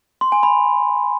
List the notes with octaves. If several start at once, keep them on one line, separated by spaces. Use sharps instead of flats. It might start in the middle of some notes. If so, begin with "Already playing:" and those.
C6
G#5
B5